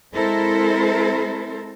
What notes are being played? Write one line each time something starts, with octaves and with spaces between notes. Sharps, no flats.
G#3 C4 E4 A4 A#4 C5